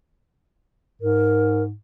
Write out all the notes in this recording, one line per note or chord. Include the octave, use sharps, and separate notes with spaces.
G#2 A#4